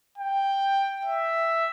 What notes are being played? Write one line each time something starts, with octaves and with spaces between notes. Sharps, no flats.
G5
E5